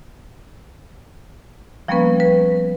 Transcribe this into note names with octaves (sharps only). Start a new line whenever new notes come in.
F3 G3 A#3 B3 C#4 B4
B4